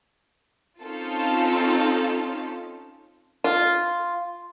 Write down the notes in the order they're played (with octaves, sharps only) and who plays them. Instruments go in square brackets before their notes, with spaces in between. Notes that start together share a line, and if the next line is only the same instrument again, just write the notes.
[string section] C4 C#4 D#4 F4 A4
[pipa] F4